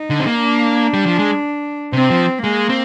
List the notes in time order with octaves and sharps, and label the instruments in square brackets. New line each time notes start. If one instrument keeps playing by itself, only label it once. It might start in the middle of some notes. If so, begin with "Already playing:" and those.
Already playing: [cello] D#4
[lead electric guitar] D3
C4
A#3
[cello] D4
[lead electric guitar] G3
F3
G#3
[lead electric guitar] C3 [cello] C4
[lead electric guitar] F3
[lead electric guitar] G#3 [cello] A#3
[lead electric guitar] C4